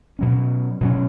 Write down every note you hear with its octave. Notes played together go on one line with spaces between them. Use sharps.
B2 F#3 C#4
B2 F#3 C#4